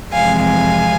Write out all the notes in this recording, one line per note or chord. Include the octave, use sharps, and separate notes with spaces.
F2 C3 E3 G#3 F5 G#5
F5 G#5